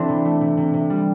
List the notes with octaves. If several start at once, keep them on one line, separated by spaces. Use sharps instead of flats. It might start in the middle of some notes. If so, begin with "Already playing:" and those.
Already playing: E3 C4 D4 E4 A4 C5
C3
A3
C3
C3
C3
G3